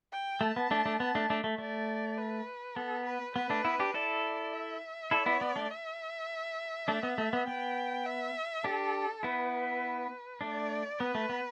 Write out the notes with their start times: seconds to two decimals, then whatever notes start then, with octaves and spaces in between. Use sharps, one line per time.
0.12 G5
0.41 A3 A5
0.56 B3
0.71 A3 D4
0.86 A3 D4
1.00 B3 A5
1.15 A3 D4
1.30 A3 D4
1.44 A3
1.58 A3 D5
2.18 B4
2.76 B3 A4
3.06 B4
3.35 B3 B4
3.50 A3 D4
3.64 B3 E4
3.80 D4 G4
3.94 E4 A4 D5
4.52 E5
5.11 E4 A4 D5
5.26 B3 E4
5.41 B3
5.56 A3 D4
5.71 E5
6.88 A3 D4
7.03 B3
7.18 A3
7.33 B3
7.47 B3 G5
8.06 E5
8.64 D4 G4 A4
9.23 B3 E4 B4
10.41 A3 D4 D5
10.99 B3 B4
11.15 A3
11.29 B3